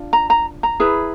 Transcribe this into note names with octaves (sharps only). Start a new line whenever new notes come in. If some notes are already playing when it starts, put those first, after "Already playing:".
Already playing: D4 F4
A#5
A#5
A#5
E4 G#4 B4